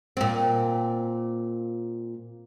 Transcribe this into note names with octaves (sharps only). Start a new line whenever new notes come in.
A#2 C4